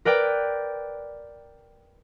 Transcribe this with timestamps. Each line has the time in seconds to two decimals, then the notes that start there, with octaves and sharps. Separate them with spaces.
0.05 A#4 B4 D5 G5